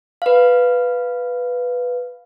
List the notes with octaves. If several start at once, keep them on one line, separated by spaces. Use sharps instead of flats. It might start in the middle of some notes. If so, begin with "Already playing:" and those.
B4 F5